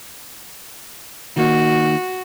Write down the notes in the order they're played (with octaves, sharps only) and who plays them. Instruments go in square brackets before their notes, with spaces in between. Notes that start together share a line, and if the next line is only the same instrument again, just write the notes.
[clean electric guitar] D#3 A#3 D#4 [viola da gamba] F#4